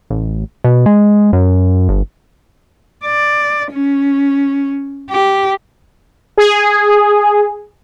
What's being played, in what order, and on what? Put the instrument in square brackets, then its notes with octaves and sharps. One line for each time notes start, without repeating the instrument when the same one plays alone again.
[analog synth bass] A1
B2
G#3
F#2
G1
[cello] D5
C#4
G4
[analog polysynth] G#4